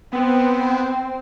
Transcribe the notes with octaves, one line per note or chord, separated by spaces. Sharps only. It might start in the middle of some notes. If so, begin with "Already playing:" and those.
B3 C4 C5